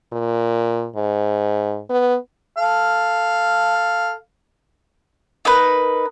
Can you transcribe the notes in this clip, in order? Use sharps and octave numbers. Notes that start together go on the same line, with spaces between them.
A#2
G#2
B3
A4 F5
D#4 A#4 B4